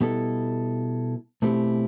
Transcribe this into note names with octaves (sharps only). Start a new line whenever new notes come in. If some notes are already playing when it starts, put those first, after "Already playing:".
B2 G3 B3 E4 A4
B2 A3 C4 E4 G4